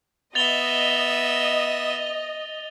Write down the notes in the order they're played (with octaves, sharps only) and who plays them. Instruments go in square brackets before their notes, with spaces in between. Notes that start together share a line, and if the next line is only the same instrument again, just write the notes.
[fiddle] B3 E5 [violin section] D#5 [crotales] A6 F7 G7